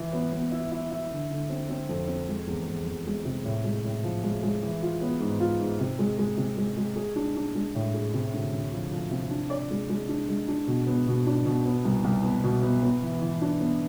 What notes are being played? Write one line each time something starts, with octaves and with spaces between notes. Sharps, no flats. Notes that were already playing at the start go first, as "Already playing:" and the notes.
Already playing: E3
B3
B3
E4
E4
E4
D3
D3
C4
C4
F2
C4
G#3
E2
E2
E2
G#3
C3
A2
G#3
A2
F3
G#3
G#3
E3
F4
B3
G#2
F4
G#2
C3
G#3
G#3
C3
G#3
G#3
G#4
D4
D4
G#3
A2
G#4
C3
D2
D2
F3
F3
C3
D4
D5
G#3
G#3
D4
G#3
D4
B2
B3
B2
D4
B2
B3
C2
C2
B3
B2
B3
B3
E3
E3
D4
B3